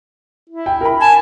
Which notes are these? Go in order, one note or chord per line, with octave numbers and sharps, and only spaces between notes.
E4
G5
A#4 B5
G#5 A5